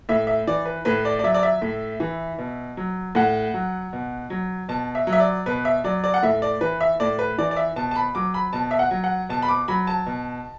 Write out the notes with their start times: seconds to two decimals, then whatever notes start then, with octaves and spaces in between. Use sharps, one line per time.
0.09 A2 E5
0.27 E5
0.47 E3 D5
0.65 B4
0.85 A2 B4
1.05 D5
1.19 D5
1.23 F#3 E5
1.34 D5
1.43 E5
1.62 A2
2.00 E3
2.38 B2
2.77 F#3
3.15 A2 F#5
3.54 F#3
3.93 B2
4.30 F#3
4.69 B2 A5
4.95 E5
5.07 F#3
5.13 E5
5.20 D5
5.46 B2 B4
5.65 E5
5.84 F#3 D5
6.04 D5
6.14 F#5
6.23 A2 E5
6.42 D5
6.61 E3 B4
6.81 E5
7.00 A2 D5
7.19 B4
7.38 E3 D5
7.51 D5
7.57 E5
7.76 B2 A5
7.91 A5
7.96 B5
8.15 F#3 D6
8.34 B5
8.53 B2 A5
8.71 E5
8.79 F#5
8.91 F#3
9.04 F#5
9.29 B2 A5
9.42 B5
9.48 D6
9.68 F#3 B5
9.87 A5
10.06 B2